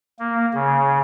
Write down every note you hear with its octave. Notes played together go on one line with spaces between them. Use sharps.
A#3
C#3